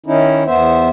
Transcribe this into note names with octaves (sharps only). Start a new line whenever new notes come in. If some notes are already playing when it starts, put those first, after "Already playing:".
D#3 C#4 D#4 E4
E2 B3 C5 E5